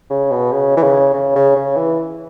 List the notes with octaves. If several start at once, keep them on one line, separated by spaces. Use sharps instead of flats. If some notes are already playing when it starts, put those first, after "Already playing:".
C#3
B2
C#3
E3
C#3
C#3
C#3
C#3
E3